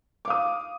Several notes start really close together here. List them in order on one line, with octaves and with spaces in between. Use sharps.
D6 F5 D#6